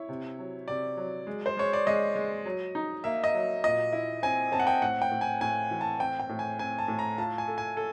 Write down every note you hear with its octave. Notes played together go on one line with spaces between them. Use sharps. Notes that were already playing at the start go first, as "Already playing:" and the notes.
Already playing: E4 C#5
C3
F#3
C3 D5
F#3
G#3
C5
G#3 C#5
D5
G#3 D#5
G#3
F#3
D#4
A#3 E5
D#5
F#3
A#2 D#5
E4
C4 G#5
C4 A5
F#5
G5
A2 F#5
G5
A2
G#5
A2 G#5
E3
A5
C4 G5
G5
A2
G#5
C4 G#5
A5
A2
A#5
F4 A5
G#5
A4
G#5
A4